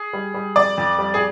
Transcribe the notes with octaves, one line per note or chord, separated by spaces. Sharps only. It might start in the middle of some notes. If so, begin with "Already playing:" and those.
Already playing: G#4
G3
G3
F2 D5
F2
G3
G#4